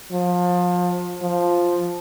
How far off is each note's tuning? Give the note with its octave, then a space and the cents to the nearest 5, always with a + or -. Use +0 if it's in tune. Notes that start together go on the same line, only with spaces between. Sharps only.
F3 +30
F3 +0